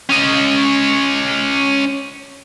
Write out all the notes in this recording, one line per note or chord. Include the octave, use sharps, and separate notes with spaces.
C#4 D#5